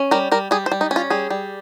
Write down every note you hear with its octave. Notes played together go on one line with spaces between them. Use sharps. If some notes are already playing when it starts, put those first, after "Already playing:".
Already playing: C#4
G3 A#4
G3 A#4
G3 G#4
C5
G3
D#4
C#4
F4
G3 G#4
G3